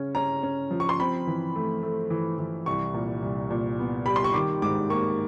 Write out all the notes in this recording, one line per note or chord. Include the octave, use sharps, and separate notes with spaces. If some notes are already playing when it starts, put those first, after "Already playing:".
Already playing: C#3 C#4
C#4 A#5
C#4
F3
C#6
C6
C4 B5
E3
A3
A3
E3
E3
C2 C#6
A#2
C2
A#2
B3
G3 B5
C6
C#6
D#3 D6
G#2 D6
A#3 C#6